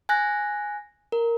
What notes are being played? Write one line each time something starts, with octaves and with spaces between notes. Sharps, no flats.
G#5 F#6 A#6
A#4